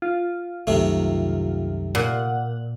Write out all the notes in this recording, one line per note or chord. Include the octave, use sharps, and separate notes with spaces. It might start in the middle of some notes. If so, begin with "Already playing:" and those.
F4
C2 F#2 C3 D#3 A3
A#2 F#5